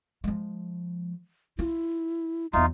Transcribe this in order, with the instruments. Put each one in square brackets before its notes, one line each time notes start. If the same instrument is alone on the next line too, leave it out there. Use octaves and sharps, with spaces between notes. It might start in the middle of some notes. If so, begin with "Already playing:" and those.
[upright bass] F3 G#3
[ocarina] E4 [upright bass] F4
[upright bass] E2 F#3 [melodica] D#4 F4 [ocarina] E5